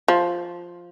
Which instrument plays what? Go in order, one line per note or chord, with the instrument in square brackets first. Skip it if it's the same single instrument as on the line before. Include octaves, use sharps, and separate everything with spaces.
[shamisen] F3